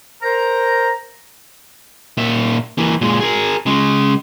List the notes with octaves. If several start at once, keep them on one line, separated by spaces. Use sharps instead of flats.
A#4 C5 A#5
A#2 E5
E3 A#3
A#2 G#3
G#4 A#4
C#3 G#3